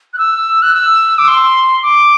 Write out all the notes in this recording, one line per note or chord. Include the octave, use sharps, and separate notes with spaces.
F#6
E6
F#6
E6
D6
C6
D6